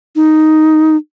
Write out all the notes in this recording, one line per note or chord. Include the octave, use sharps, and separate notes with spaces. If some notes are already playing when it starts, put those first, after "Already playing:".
D#4